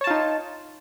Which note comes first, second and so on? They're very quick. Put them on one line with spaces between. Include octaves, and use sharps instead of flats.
C#5 A5 F4 D#4